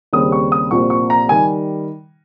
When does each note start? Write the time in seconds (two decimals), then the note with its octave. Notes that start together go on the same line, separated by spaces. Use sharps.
0.13 D#2 C#3 G3 C4 D#6
0.32 C#6
0.52 D#6
0.71 C2 A#2 F3 C4 C#6
0.90 C#6
1.10 A#5
1.29 D#3 G3 G#5